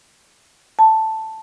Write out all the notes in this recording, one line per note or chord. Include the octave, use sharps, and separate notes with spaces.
A5